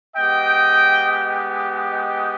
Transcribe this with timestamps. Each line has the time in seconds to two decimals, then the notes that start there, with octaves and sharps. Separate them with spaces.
0.16 G#3 B3 G4 D#5 G5
1.90 D#5 G5